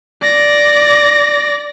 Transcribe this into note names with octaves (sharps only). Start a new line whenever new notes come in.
D5 A#6